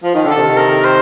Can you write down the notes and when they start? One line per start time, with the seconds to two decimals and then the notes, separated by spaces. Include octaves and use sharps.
0.03 F3
0.14 D#3
0.25 D3
0.31 A4
0.36 C3 D#3
0.58 A#4
0.84 C5